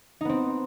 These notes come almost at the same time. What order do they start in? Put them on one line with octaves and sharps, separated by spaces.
D#4 B3 C4